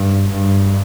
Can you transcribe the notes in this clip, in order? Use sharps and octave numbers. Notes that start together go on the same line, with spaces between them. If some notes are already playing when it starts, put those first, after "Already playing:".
Already playing: G2
G2